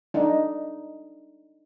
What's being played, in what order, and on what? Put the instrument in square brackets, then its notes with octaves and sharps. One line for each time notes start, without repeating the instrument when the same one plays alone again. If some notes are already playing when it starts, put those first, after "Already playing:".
[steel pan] D4 D#4